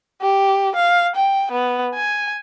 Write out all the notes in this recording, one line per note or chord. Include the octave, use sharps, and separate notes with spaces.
G4
F5
G5
B3
G#5